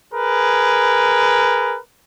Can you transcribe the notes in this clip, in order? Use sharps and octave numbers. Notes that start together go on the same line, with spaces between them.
G#4 A#4 B4